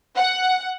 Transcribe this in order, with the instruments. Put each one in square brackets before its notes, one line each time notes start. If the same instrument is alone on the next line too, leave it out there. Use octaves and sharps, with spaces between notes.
[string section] F#5